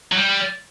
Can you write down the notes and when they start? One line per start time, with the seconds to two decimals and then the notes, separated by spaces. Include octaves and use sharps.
0.12 F#3
0.16 G3